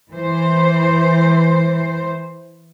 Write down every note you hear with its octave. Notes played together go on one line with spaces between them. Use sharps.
E3 C5